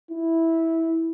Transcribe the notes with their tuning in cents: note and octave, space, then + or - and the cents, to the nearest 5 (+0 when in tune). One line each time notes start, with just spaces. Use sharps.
E4 -10